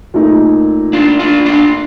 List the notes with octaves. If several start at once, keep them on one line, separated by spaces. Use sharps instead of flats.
A#2 A3 D#4
D4 F4
D4 F4
D4 F4